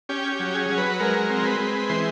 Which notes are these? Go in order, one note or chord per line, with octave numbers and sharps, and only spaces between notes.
C#4 G4
G4
F#3
G#4
F#3
B4
G#3 A#4
C4
B4
G#3
E3 C5